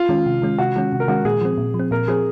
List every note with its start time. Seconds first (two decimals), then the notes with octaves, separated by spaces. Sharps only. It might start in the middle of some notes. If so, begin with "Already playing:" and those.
Already playing: F4
0.09 D#3 G#3 C#4
0.26 C3
0.42 D#3 G#3 C#4
0.58 C3 F#4
0.76 D#3 G#3 C#4
0.93 C3
1.00 A#4
1.08 D#3 G#3 C#4 F#4
1.25 A#2 G#4
1.41 F3 C4
1.58 A#2
1.74 F3
1.79 C4
1.91 A#2 A#4
2.07 F3 C4 G#4